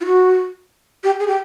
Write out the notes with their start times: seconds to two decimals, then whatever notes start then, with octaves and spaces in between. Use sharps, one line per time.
0.01 F4
0.05 F#4
1.04 G4
1.20 G#4
1.28 G4